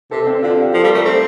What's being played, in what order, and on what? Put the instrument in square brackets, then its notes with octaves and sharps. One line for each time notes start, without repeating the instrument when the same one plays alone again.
[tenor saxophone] C3 [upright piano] A4
[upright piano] C4
[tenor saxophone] D3 [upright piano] F4
[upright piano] G4
[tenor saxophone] F3 [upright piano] A4
[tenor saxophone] G3
[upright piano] A#4
[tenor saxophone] A3
[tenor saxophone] C4 [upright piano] A4